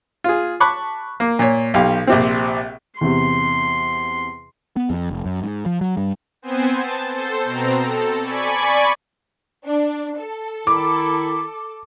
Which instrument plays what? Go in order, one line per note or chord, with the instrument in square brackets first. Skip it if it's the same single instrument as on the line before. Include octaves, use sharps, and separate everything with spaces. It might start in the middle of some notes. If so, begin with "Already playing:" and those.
[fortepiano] F4 G#4
A5 B5 C#6 D6 F#6
A#3
A#2 C#5
B1 G4 F5
A#1 C3 C4
[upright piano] E2 C3 [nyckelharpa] C6
[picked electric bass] B3
F2
F1
F#2
G#2
F3
F#3
G2
[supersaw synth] B3 C4 C5 G#5
A5 A6
A4 C5
B2 C4 A#5
A4
D5 G#5 B5 C#6
[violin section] D4
A4
[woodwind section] D#3 E4 [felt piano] D6